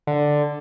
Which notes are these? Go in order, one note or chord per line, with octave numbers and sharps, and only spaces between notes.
D3